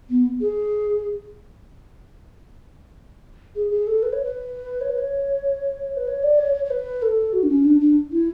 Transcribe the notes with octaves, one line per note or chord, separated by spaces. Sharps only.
B3
G#4
G#4
G#4
A4
B4
C#5
B4
C#5
B4
C#5
B4
C#5
D5
C#5
C#5
C#5
B4
A4
F#4
D4
C#4
D4
D4
E4